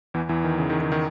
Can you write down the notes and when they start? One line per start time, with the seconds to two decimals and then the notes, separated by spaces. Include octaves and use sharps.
0.14 E2 E3
0.29 E2 E3
0.44 D#3
0.58 C#3
0.70 D#3
0.81 D#3
0.92 D#3